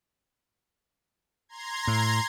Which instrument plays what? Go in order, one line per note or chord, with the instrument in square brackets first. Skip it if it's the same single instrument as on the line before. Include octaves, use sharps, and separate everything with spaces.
[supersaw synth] A#5 C6 G#6
[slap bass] A2